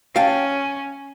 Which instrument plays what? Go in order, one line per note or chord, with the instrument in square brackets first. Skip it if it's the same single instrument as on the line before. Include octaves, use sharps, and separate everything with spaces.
[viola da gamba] C#4 [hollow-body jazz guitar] F5 G5 A5